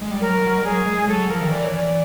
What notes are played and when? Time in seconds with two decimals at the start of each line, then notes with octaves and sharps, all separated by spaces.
0.02 G#3
0.11 G3
0.20 F#3 A#4
0.42 F#3
0.58 G3
0.64 F#3 G#4
0.86 G#3
1.08 F#3 A4
1.30 F3 A#4
1.41 D#3
1.51 E3 D5
1.64 C#5
1.73 E3 D5